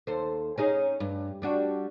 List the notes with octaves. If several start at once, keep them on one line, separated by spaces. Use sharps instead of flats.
D#2 A4 C5
C#4 D#4 G#4
G2
G3 D4 F#4